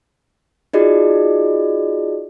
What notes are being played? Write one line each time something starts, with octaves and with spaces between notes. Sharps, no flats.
D#4 F4 F#4 G#4 D5 D#5